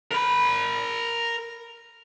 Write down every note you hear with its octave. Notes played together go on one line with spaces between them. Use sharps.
A#4 B5